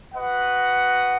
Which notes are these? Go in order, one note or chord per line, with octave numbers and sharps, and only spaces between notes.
F#4 B4 D#5 F#5